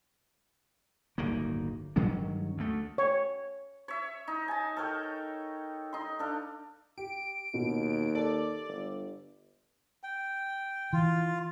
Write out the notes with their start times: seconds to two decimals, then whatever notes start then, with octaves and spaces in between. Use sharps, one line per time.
1.18 D1 G1 D#3 A#3
1.96 G2 D#3 F#3 C#4
2.58 D2 A3
2.98 C#5
3.88 C#5 E5
4.28 D#4
4.48 G#5 A5
4.77 A4 A#4 C#5 G5
5.93 D#4 C6
6.19 D4 A4 F5
6.98 G4 D7
7.54 D#2 B2
8.15 A4 D5
8.68 G1
10.03 G5
10.93 E3 F4